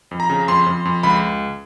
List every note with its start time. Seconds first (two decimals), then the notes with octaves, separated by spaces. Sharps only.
0.11 F2
0.20 A#5
0.30 C#3
0.48 F2 C6
0.66 F2
0.85 F2
1.03 C#2 B5